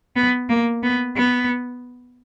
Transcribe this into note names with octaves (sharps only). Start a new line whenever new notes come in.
B3
A#3
B3
B3